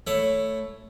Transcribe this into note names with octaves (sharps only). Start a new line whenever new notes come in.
A3 E4 C#5